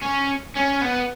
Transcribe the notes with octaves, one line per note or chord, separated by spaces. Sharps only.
C#4
C#4
B3